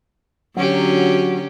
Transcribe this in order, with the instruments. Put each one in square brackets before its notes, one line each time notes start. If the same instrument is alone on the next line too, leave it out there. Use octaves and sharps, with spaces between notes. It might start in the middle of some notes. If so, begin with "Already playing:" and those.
[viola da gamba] D3 C#4 G4 [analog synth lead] F#3